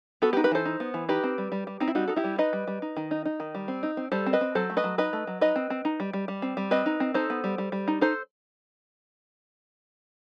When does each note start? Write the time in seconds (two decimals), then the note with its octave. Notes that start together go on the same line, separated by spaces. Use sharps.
0.22 B3 F#4 A4
0.33 G4 B4
0.37 D#4
0.44 G4 B4
0.51 E3 A4 C5
0.65 D#4
0.80 B3
0.94 E3
1.09 D#4 G4 B4
1.23 C4
1.38 G3
1.52 G3
1.67 G3
1.80 C4 D#4
1.88 E4
1.95 G3 D#4 F#4
2.08 D#4 A4
2.16 E4 G4
2.24 G3
2.38 D#4 B4 D#5
2.53 G3
2.67 G3
2.82 D#4
2.97 D#3
3.11 D#4
3.25 D#4
3.40 D#3
3.55 G3
3.68 C4
3.83 D#4
3.97 C4
4.12 G3 A4 C5
4.26 C4
4.33 B4 D#5
4.41 C4
4.55 F#3 A4 C5
4.70 A3
4.77 B4 D#5
4.84 F#3
4.98 D#4 B4 D#5
5.13 A3
5.27 F#3
5.41 D#4 B4 D#5
5.56 C4
5.70 C4
5.85 D#4
6.00 G3
6.13 G3
6.28 G3
6.42 C4
6.57 G3
6.71 C4 B4 D#5
6.86 D#4
7.00 C4
7.14 D#4 A4 C5
7.30 B3
7.44 G3
7.58 G3
7.72 G3
7.88 D#4
8.01 D#4 A4 C5